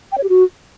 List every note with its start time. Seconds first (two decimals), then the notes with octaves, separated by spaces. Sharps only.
0.12 G5
0.18 C#5
0.23 G4
0.29 F#4